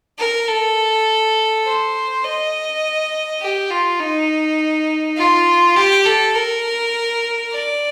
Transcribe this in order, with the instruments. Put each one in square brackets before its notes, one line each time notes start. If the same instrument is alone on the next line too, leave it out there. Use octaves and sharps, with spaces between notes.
[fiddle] A#4
A4
C5
D#5
G4
F4
D#4
F4
G4
A4
A#4
D5